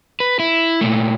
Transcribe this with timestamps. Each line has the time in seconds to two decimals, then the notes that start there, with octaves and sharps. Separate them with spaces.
0.20 B4
0.39 E4
0.81 A#2 A3